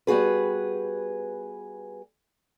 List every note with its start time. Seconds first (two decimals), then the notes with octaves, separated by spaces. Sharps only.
0.07 G3 B3 F#4 G#4 B4